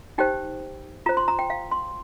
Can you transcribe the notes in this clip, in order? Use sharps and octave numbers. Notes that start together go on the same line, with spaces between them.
D#4 G4 C5 G5
F4 C5 A#5
C6
A#5
G5
F5
C6